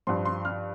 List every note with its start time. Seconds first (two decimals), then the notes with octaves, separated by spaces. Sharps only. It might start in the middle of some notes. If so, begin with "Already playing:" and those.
0.07 G2 F3 C6
0.25 C6
0.45 F6